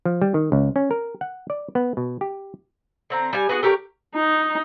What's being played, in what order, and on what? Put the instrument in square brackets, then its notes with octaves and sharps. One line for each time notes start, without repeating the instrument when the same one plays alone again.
[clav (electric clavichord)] F3
G3
D#3
C#2
C#4
A#4
F#5
D5
B3
B2
G4
[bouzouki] D3 C4 A#5
G3 G#5
B3 F#4 G#4 F#5
A3 G4 A#4 C#5
[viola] D#4